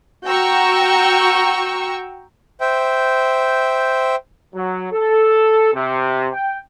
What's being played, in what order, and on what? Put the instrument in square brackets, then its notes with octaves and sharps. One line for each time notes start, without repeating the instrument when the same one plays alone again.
[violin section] F#4 G5 A#5 C#6 E6
[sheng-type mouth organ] C5 E5 G5
[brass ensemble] F#3
A4
C3
G5